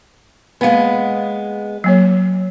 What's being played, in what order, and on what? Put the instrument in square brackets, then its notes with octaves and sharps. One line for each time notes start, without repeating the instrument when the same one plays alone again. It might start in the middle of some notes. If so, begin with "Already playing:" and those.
[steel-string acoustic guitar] G#3 B3 [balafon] A#3 F5
[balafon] F#3 A#3 C#5